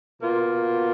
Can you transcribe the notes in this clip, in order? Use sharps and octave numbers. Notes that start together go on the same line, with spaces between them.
B2 A#3 F4